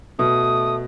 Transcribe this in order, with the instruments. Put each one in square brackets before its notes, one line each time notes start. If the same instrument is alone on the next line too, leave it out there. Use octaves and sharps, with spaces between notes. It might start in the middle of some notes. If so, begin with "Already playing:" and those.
[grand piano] B2 [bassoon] A3 [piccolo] D#6